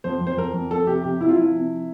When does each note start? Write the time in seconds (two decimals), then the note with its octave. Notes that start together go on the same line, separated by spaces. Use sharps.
0.04 F2 C5
0.21 F2
0.27 C5
0.37 F2 A#4
0.54 F2
0.71 F2 A4
0.87 C3 G4
1.04 C3 G4
1.20 C3 E4
1.29 F4
1.36 F3 E4
1.54 C3